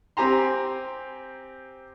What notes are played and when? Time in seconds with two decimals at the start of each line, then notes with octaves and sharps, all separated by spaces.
0.17 C4 G4 G#5 A#5 C6